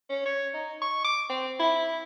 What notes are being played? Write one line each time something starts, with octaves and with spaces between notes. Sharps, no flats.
C#4
C#5
D#4
C#6
D6
C4
E4